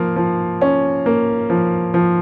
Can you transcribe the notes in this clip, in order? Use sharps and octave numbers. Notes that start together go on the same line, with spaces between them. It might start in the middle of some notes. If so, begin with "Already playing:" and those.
Already playing: F3 A#3
F3
C#4
A#3
F3
F3